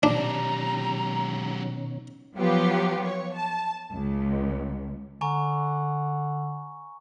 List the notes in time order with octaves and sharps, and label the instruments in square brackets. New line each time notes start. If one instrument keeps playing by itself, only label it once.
[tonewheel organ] B2 D#3 C#4 [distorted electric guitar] F#3 G4 [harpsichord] D4 [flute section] A#5
[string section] F3 F#3 B3 F4 G4
C#5
A5
C#2
[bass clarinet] D3 [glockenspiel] G#5 A#5 C#6